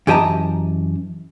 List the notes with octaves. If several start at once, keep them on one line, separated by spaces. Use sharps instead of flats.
F#2 E3 G4 D#5 A5 A#5